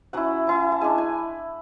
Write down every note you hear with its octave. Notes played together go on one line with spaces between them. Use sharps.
F#3 C#4 E4 F#5
F#3 C#4 E4
A5
G#3 D4 G#5
G#5